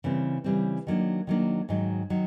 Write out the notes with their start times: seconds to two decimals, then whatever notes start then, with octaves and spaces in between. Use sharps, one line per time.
0.04 C#3 E3 G3 C4
0.44 C#3 E3 G3 C4
0.87 D#3 F#3 A#3 D4
1.27 D#3 F#3 A#3 D4
1.69 G#2 D#3 F#3
2.10 D#3 F#3